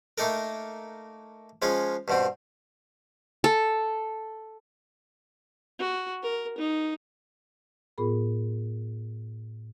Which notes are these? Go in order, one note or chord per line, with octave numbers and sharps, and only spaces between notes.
A3 A#3 D#4 A4 A#4
F3 G#3 C#4 F4
G2 B2 C4
A4
F#4
A#4
D#4
A2 B3 F4 G#4 A#4 B5